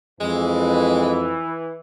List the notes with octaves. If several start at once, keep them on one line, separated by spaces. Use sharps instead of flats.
F2 E3 G#3